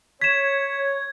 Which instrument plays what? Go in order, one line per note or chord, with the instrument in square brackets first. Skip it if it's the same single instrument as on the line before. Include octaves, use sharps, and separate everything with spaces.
[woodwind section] C#5 [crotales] G#6 [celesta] B6 E7